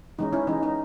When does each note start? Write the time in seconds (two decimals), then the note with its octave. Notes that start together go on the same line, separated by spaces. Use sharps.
0.19 E3 G#3 C#4 D#4
0.33 C#4 E4
0.47 E3 G#3 C#4 D#4
0.63 D#4